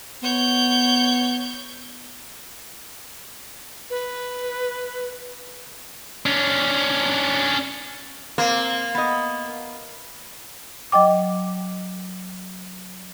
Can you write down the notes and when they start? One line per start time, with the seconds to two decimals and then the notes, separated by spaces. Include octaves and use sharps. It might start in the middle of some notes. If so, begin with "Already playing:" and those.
0.23 B3 C#5 G6
3.90 B4
6.26 C#4 D4
8.38 A#3 C4
8.95 B3 D#5
10.92 F#3 D#5 G5 D6